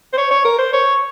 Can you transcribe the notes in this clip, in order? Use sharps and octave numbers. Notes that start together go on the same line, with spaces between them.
C5
C#5
C#5
A#4
C5
C#5